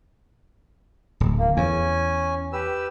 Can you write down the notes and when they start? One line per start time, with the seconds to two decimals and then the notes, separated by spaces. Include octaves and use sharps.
1.20 D1
1.39 A#3
1.57 E2 C#4 G#5
2.53 G4 B4 E6